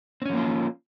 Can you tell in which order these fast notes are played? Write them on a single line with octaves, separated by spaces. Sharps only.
C4 C#4 F3 A#3 F4